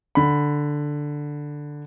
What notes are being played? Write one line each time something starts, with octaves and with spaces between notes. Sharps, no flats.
D3 B5